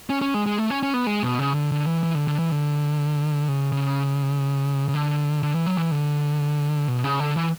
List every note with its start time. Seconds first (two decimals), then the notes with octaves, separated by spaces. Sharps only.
0.10 C#4
0.22 C#4
0.34 G#3
0.46 G#3
0.58 A3
0.70 C#4
0.83 C#4
0.94 B3
1.07 G#3
1.23 B2
1.39 C#3
1.54 D3
1.72 D3
1.86 E3
2.03 E3
2.15 D3
2.28 D3
2.39 E3
2.52 D3
3.48 C#3
3.72 C#3
4.88 C#3
4.94 D3
5.43 D3
5.55 E3
5.66 F#3
5.78 E3
5.91 D3
6.88 B2
7.04 C#3
7.20 D3
7.36 E3